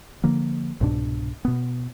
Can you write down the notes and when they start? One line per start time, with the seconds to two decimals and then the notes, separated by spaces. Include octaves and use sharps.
0.24 D3 F3 A#3
0.81 C2 G#2 B2 D4
1.45 B2 B3